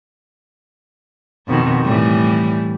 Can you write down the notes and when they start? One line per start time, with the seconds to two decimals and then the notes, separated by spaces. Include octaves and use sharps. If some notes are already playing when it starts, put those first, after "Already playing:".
1.48 F2 B2 D#3
1.84 A2 E3 G3